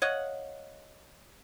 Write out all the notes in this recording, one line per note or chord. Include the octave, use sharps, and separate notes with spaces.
C#5 D#5 F5 F#5